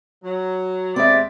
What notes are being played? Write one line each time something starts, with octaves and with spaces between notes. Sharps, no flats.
F#3
D#2 G3 G#3 C4 D5 E5